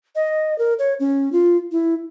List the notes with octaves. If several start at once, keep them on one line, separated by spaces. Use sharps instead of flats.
D#5
A#4
C#5
C#4
F4
E4